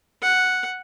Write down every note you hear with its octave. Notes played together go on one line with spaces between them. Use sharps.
F#5